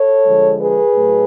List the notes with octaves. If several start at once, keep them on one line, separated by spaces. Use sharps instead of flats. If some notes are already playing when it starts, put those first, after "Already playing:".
Already playing: A4 C#5
D3 F3 G#3
G#4 B4
A2 F#3 A3